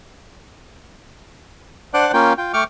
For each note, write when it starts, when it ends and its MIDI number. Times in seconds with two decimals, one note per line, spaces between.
1.94 2.12 62
1.94 2.12 72
1.94 2.12 74
1.94 2.12 78
1.94 2.12 86
1.94 2.12 90
2.13 2.33 58
2.13 2.33 61
2.13 2.33 65
2.13 2.33 79
2.38 2.53 65
2.38 2.53 79
2.54 2.64 57
2.54 2.64 79
2.54 2.64 85
2.54 2.64 86
2.54 2.64 89